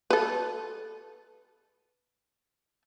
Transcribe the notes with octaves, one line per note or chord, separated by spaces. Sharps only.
A4 B4